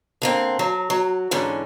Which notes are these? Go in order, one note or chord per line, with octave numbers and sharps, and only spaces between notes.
D3 A#3 C4
F#3
F#3
G#2 D3 E3 C#4